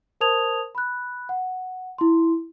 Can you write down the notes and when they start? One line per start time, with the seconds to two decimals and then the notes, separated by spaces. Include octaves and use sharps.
0.21 A#4 C5 A5 D#6 G#6 F7
0.75 B5 F#6
1.29 F#5
1.98 E4 C6